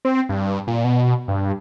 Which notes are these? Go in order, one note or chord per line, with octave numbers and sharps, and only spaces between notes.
C4
G2
A#2
B2
G2